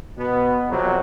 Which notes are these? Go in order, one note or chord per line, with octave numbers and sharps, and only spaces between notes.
B2 B3
F2 C3 F#3